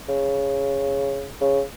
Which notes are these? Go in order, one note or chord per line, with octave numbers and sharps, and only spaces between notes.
C#3
C#3